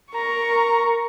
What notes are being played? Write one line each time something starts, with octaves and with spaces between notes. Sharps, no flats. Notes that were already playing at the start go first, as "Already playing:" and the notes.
A#4 A#5 C#6